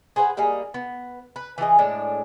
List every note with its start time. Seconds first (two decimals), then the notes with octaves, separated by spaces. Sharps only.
0.16 G#4 B4 C5 F#5
0.37 G3 A#3 D#4 G#4
0.74 B3
1.36 B4
1.58 E3 F3 G#4 D#5
1.78 A2 G#3 D4